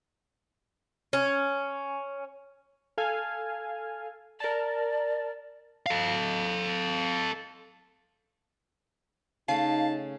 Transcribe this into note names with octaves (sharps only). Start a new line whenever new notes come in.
C#4
A4 F5 G#5
A#4 D5 A5
A4 F5
C#3 A3 D#4 F5 A5